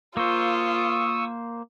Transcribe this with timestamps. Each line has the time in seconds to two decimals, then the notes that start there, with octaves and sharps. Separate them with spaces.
0.17 A#3 F4 C5 C#6 D#6 E6